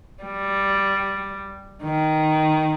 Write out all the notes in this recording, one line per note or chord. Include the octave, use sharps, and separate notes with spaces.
G3
D#3